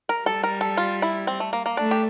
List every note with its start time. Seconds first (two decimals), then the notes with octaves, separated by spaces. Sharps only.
0.09 A#4
0.26 G3 A4
0.43 A#4
0.61 A4
0.77 F4
1.02 E4
1.27 C4
1.40 A3
1.53 A#3
1.66 A#3
1.77 A3 D4
1.91 G4